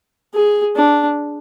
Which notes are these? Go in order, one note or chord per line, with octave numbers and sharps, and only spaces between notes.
G#4
D4